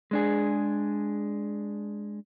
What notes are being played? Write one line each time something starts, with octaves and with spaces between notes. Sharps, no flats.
G#3 D4 G#4